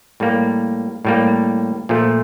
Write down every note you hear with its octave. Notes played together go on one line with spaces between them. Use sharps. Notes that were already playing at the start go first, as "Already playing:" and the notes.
A2 G3 A#3
A2 G3 A#3
A#2 F3 A3